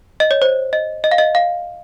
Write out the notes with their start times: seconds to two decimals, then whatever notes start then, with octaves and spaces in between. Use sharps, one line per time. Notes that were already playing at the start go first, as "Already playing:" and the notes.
0.20 D#5
0.31 C#5
0.42 C5
0.73 D#5
1.04 D#5
1.11 F5
1.18 D#5
1.35 F5